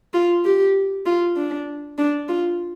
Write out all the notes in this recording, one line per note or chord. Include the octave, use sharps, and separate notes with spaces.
F4
G4
F4
D4
D4
F4